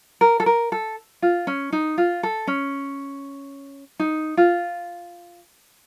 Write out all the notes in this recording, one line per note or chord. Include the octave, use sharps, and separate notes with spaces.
A#4
A4
A#4
A4
F4
C#4
D#4
F4
A4
C#4
D#4
F4